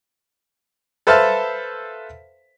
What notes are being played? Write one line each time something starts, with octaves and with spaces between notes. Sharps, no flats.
A4 B4 C5 E5 F5 A5